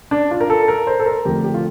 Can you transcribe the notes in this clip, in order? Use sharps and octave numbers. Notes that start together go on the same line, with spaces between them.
D4
F4
A#4
A4
A#4
C5
A4
A#4
F2 D3 A3 G4
G4
F4